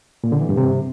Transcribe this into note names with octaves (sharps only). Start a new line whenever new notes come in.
A#2
D3
E3
G2
C3